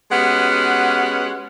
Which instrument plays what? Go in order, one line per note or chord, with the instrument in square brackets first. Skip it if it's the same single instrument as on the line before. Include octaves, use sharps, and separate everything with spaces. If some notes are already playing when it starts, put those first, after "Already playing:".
[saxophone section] G#3 B3 C#4 F#4 G4 F#5